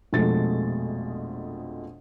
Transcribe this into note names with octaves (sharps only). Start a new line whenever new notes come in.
A#1 F2 B2 G#3 A3 A6